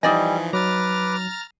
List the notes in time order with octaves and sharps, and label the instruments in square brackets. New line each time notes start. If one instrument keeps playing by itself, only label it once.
[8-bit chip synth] E3 F3 [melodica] G3 [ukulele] D#4 D5 D#5 [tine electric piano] G#5
[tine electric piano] F#3 [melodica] B4 D6 [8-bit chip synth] A#5 F6 A6